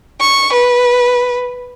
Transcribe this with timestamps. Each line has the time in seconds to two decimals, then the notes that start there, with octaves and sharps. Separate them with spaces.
0.20 C#6
0.53 B4